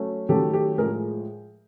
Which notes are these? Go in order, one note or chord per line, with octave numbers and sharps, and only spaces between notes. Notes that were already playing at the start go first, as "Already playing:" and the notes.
Already playing: F#3 A3 C#4
D#3 F#3 A3 C#4 G4 A4
G4 A4
A2 F3 G#3 G#4 A#4